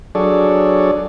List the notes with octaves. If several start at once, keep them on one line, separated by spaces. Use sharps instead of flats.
F#3 D4 G#4 A4 C#5 D5